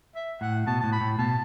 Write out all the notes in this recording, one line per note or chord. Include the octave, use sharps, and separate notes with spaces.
E5
A2 F#5
B2 A5
A2 A5
B5
A2
B2 A5